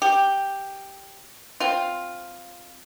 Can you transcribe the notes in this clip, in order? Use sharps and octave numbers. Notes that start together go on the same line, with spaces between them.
G4
C4 F4